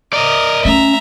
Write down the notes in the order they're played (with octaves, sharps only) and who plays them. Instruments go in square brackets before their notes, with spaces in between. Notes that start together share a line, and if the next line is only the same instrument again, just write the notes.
[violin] A#4 [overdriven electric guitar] D5 D#5
[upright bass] A3 [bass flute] C#4 [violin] E5 A#5